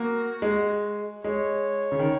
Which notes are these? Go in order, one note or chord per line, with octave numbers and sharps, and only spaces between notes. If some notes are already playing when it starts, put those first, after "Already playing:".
Already playing: A#3 F#4
G#3
G#3 C#5
C#3
D#3